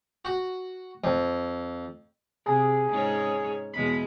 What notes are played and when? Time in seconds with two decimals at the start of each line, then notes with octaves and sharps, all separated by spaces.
0.25 F#4
1.04 F2
2.46 C3 G#4
2.91 G#2 C#4 C#5
3.73 E2 B2 G#3 B5